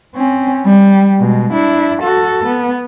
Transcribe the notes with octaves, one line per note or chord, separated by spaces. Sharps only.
C4 C#4
G3
B2 G#3
D4 E4
F#4 A4
B3